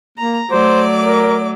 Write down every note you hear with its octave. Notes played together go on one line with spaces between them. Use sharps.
A#3 A#5
F#3 A3 C5 D5 D6
A#4